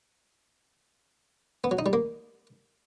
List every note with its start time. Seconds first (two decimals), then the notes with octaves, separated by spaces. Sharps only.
1.64 B3
1.71 F#3
1.79 D#4
1.86 G3
1.93 A#3